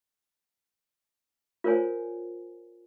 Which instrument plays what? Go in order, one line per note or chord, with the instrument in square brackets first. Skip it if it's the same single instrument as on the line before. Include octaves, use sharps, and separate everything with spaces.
[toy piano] F4 A#4 C5 C#5 G#5